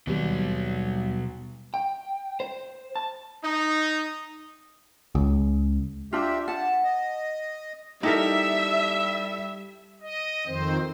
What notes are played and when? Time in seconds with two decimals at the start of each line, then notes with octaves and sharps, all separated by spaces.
0.07 D#2 B2 F#3 G3 B3
1.74 G5
2.40 C5
2.96 A5
3.44 D#4
5.15 C#2
6.13 D4 F4 G4 E5
6.48 F#5 A5
6.84 D#5
8.03 G3 D#4 E4 G4 A4 A#4 E5
10.02 D#5
10.46 F2 D#3 C4 C5